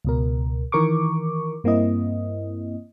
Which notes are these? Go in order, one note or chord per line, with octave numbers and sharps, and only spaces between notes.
C#2 B2 A#4
D#3 E3 A#4 C#6 D6
G2 A#3 C4 E4 D#5